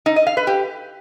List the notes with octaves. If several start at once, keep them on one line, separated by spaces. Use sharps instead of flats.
D#4
D#5
F5
B4
G4